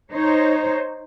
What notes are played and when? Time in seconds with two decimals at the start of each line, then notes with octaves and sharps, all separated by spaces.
0.13 D#4 C5 C#5